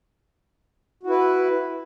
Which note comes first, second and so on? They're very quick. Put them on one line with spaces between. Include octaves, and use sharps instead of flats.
F#4 E4 B4